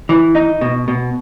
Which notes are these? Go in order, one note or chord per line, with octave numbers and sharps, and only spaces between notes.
E3
D#4
B2
B2